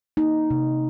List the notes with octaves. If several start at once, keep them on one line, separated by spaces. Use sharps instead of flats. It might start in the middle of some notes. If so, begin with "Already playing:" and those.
A#3 D#4
C3